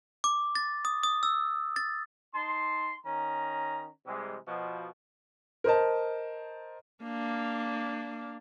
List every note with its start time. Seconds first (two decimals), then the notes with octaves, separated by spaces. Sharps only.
0.24 D6
0.55 A6
0.85 D#6
1.03 D#6
1.23 E6
1.76 A6
2.35 D#4 A5 C6
3.05 D#3 C#4 A#5
4.07 C3 E3 G3 G#3
4.48 B2 F3
5.64 A#4 C5 D#5 A5
7.03 A#3 D4